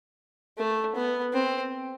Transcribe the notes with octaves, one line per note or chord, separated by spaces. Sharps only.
A3
B3
C4